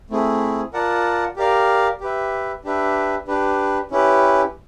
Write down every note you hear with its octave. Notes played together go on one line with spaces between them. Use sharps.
A3 C4 E4 G#4
F4 A#4 D5 F#5 A5
G4 A#4 D5 F5
G4 B4 E5
D4 G4 B4 E5
D4 G4 B4
C#4 E4 G4 B4